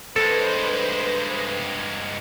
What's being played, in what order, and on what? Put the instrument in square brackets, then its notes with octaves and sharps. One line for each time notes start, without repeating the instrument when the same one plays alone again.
[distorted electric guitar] G2 G#3 [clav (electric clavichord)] A4 [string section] B4 C5